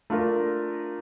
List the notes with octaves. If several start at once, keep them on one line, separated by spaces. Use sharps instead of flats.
A3 D4 F4 A#4